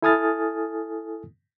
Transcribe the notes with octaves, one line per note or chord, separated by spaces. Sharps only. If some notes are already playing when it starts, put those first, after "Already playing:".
E4 A4 G#5 D#6 F6 A6